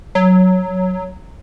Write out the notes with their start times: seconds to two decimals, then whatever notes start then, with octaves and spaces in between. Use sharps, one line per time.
0.15 F#3